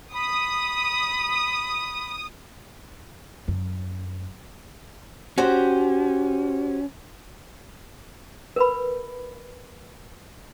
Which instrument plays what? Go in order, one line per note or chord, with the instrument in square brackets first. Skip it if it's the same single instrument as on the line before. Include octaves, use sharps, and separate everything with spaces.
[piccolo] B5 [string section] D#6
[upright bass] F#2
[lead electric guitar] C#4 [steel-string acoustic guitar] F#4 G4 C5
[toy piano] A#4 B4 B5